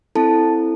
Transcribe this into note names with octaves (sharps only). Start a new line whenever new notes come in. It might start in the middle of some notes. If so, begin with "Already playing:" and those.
C4 E4 A4 A5